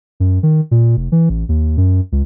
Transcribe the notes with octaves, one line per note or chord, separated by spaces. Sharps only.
F#2
D#3
A#2
F1
E3
A1
D#2
F#2
C#2